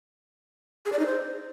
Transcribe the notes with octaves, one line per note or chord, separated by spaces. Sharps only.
G#4
D5
D#4
C5